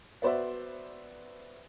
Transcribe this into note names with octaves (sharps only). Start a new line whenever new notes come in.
B3 F#4 C5 D5 E5